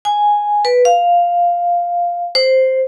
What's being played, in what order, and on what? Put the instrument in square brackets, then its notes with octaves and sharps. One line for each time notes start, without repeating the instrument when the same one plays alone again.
[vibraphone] G#5
B4
F5
C5